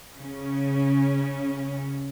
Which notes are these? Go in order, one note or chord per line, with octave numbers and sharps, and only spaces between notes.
C#3 C#4